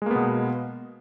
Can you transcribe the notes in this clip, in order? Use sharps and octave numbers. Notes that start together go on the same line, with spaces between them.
B2 G#3 A#3 B3